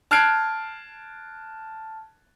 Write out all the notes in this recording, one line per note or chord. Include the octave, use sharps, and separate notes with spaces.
A5 F6 F#6 G#6 C7 D7